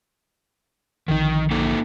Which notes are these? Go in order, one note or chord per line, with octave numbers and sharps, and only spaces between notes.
A#1 D3 D#3 F3 D#4
A#3 D#4 A4